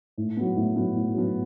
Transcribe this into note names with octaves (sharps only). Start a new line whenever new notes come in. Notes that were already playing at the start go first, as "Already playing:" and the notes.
A2
F#3 B3
A2
F#3 B3
A2
F#3 B3